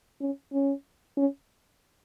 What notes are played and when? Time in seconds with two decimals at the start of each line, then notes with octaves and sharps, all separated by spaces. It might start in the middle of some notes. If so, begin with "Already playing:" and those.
0.21 C#4
0.53 C#4
1.17 C#4